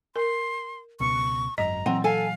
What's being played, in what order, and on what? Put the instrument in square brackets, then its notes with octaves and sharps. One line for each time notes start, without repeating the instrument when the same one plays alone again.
[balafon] A#4 [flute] C6
[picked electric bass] C#2 B2 [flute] C#6
[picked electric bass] G#1 F#2 [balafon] D#5 [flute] A#5
[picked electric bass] A#2 E3 F#3 [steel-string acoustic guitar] C4 [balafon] F#5
[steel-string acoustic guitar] A4 G#5 [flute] F5